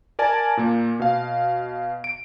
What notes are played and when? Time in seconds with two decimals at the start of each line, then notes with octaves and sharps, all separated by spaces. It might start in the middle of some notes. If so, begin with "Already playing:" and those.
0.19 A#4 D5 G#5 A5
0.57 A#2 A#3
0.99 B2 F5
2.04 D7